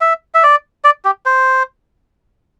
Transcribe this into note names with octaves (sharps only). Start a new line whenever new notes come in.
E5
E5
D5
D5
G4
C5